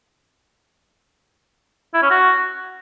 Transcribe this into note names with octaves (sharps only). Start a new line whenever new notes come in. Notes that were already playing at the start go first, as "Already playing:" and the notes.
E4
C#4
F#4